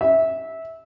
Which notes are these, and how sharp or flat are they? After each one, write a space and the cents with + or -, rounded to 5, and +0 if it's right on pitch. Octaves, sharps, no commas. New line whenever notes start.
E5 -20